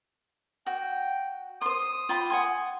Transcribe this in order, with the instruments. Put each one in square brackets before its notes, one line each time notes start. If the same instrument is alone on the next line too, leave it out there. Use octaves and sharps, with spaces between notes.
[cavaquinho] F#4 [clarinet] G5
[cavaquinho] C5 C6 [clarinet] D#6
[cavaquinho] F4 G5 B5
F#5 G#5 C6